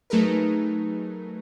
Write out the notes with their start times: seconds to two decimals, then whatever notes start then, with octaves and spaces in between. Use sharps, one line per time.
0.10 F#3 A3 D#4 G#4 A#4 B4